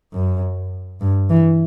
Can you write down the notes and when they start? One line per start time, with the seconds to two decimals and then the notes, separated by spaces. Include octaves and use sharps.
0.13 F#2
1.01 G2
1.30 E3